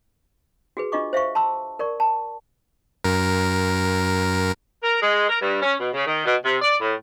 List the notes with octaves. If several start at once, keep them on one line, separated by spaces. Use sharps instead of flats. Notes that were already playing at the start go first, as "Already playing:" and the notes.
F#4 G#4 B4
D4 F4 D#5 C#6 D6
C5 E5 F5 C#6
A5 C6 E6
A#4 D5 C#6
A5
F#2 A#4
A#4
G#3
A#4
G2
C#4
B2
C#3
D#3
B2
C3
D5
A2